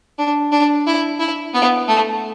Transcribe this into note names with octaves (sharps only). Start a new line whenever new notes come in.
D4
D4
E4
E4
B3
A3